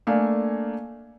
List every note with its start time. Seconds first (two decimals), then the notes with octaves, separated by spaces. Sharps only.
0.07 A3 A#3 D4 F5 G#5